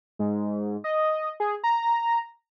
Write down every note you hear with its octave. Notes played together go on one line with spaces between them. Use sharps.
G#2
D#5
G#4
A#5